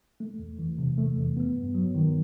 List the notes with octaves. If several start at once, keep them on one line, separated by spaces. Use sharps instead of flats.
A3
E2
E3
C3
A3
E2
B3
G2
F#3
D#3